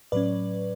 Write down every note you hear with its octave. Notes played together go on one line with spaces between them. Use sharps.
A2 F#3 C#4 B4 D5